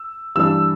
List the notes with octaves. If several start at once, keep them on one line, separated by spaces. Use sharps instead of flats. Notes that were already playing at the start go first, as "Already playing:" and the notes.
Already playing: E6
G2 E3 G3 D4 E6